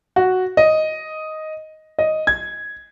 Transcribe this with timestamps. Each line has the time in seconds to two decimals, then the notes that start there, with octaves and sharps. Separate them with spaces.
0.16 F#4
0.57 D#5
1.99 D#5
2.27 G#6